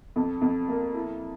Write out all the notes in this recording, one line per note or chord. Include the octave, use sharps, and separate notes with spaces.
F2
F2
A#3
E4